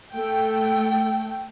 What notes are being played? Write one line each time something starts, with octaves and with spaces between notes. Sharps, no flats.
A3 G5